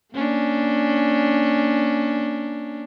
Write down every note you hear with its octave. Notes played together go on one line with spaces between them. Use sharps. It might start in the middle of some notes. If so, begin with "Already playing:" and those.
A#3 C#4 D4